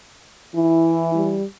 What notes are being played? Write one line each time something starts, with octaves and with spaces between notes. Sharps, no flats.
E3 E4
G3